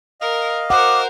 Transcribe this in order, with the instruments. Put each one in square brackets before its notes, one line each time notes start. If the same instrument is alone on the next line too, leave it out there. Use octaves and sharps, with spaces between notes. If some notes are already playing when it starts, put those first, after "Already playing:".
[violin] A#4 [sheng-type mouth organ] D#5 F5
[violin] A#4 C5 [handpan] F#5 [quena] D6